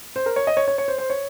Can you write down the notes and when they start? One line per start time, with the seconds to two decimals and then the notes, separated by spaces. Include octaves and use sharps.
0.16 C5
0.26 A#4
0.36 C#5
0.47 D#5
0.57 C#5
0.68 C#5
0.78 C#5
0.88 C5
0.98 C5
1.10 C#5